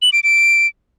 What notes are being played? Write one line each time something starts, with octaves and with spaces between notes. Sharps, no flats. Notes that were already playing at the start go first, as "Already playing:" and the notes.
F#7
D7
D7